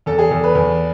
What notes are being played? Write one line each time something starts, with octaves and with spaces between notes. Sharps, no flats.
E2 A4
G#4
E2 A4
B4
E2